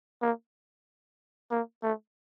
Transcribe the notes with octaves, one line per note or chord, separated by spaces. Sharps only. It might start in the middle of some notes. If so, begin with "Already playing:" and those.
A#3
A#3
A3